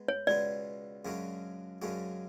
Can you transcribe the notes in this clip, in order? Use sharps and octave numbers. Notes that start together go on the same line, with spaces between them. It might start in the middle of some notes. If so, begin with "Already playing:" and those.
Already playing: G#3 B3
C#5
C#2 B2 G#3 B3 D5
F#2 C#3 G#3 D4 F#4
F#2 C#3 G#3 D4 F#4